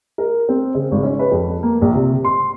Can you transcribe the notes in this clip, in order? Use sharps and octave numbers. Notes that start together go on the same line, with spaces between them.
A#4
C4
C#3
G#1
C#4
B4
F2
A#3
A#1
C3
C6